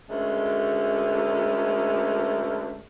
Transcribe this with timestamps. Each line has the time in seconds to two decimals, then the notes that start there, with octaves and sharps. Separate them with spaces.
0.10 D2 G#3 A3 C#4 A#4